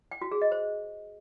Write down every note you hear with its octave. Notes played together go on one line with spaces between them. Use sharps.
G5
F#4
G#4
D#5
C5